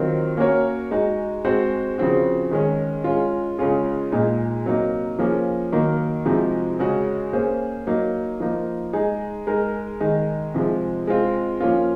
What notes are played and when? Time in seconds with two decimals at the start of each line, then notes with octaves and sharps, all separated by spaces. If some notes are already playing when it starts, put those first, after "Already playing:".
Already playing: D#3 F#3 C4 F4 A#4
0.37 A#3 C#4 F#4 A#4 C#5
0.91 G#3 D#4 F#4
1.45 G#3 C4 F#4 C5
1.98 C#3 F3 C4 F#4
2.51 D#3 G#3 C#4
3.04 G#3 C#4 F4
3.58 C#3 G#3 C#4 F4 G#4
4.12 A#2 G#3 D#4
4.65 C3 F#3 A#3 D#4
5.19 F3 A#3 C#4 G#4
5.72 D#3 F#3 A#3 D#4 A#4
6.26 C3 F3 G#3 D#4 F#4
6.79 C#3 G#3 C#4 F#4
7.33 A#3 C#4 G#4 C5
7.87 F#3 A#3 D#4
8.40 F3 A#3 D#4
8.93 G#3 D#4 G#4
9.47 G#3 D#4 A#4
10.00 D#3 G#3 D#4
10.54 C3 F3 G#3
11.07 G#3 C4 F4
11.61 F3 A#3 C#4 F4